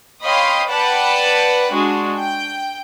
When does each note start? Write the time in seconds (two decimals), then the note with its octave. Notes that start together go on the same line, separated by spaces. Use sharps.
0.23 C#5 D#5 F5 G5 B5 C6
0.69 B4 D5 F#5 G5 A5 B5
1.73 G#3 D4 F#4
2.20 G5